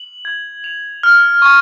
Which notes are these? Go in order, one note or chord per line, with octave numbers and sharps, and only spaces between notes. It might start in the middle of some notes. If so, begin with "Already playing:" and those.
Already playing: F#7
G#6
F7
F6
C#6